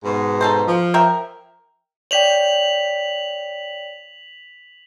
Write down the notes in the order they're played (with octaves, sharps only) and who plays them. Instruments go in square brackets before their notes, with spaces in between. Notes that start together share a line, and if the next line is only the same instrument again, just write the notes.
[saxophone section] G#2 B2
[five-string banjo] D#4 A4 C5
[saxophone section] F3
[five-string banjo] A#4 E5 G5
[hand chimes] C#5 D5 G5 [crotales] B6 F7 F#7